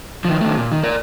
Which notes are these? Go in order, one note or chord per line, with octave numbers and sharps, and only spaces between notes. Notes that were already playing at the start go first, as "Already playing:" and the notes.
D#3 F3
D#3 A3
A#2
D#3
A#4 D5